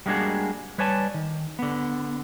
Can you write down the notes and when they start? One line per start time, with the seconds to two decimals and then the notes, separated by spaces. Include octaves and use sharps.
0.06 G3 G#3 A#3 D4 F#4 G#4
0.78 G3 B4 C#5 D5 G#5 A5
1.14 D#3
1.59 D3 B3